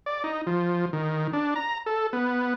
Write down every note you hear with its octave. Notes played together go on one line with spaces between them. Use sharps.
D5
D#4
F3
D#3
D4
A#5
A4
B3